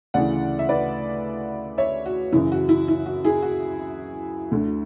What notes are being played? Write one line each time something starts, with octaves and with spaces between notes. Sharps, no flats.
D2 C#3 E3 D5 F#5
E5
B4 D5
C#5 E5
F#4
F#2 C#3 E3 E4
F#4
E4
E4
F#4
E4 G#4
F#4
D2 D3